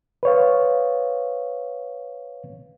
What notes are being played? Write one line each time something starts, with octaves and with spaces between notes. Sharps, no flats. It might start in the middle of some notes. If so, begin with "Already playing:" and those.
B4 C#5 F5